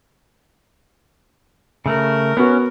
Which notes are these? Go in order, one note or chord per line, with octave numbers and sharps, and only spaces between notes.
C#3 A3 A#4
B3 C#4 F#4